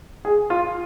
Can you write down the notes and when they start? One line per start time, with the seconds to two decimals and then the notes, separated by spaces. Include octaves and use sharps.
0.25 G#4
0.50 F4